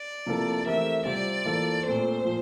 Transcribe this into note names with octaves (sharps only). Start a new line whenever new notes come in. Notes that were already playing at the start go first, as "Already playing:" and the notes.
Already playing: D5
C3 F3 A#3 E4 A4
E3 A3 C4 G4 A#4 E5
C3 G3 C4 F4 C5 D5
E3 A#3 F4 A4 C5
A#2 A3 C4 C5
A#2 F3